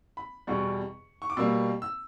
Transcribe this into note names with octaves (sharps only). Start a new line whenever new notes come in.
B5
E2 B2 G3 C#6
C#6
D6
B2 G3 A#3 E6
E6